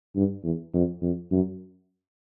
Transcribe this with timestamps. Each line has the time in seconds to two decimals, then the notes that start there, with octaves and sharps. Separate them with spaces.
0.16 G2
0.44 E2
0.74 F2
1.02 F2
1.32 F#2